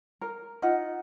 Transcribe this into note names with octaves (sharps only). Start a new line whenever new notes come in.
A#4
D#4 F4 F#5